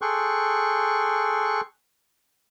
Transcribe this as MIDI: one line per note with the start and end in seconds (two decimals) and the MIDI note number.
0.02 1.61 68
0.02 1.61 69
0.02 1.61 79
0.02 1.61 84
0.02 1.61 85
0.02 1.61 90